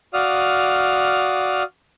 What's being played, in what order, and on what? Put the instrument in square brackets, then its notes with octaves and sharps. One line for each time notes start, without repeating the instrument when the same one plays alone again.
[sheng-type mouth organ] F#4 D5 F5 D#6 F6